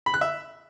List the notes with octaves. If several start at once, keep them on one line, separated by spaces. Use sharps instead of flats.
B5
F#6
E5